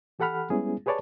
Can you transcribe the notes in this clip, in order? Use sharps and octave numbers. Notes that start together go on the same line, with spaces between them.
E3 G4 A4 F#5 B5 F6
G3 G#3 B3 C#4 E4 G#4
G4 G#4 B4 C#5 D5 A5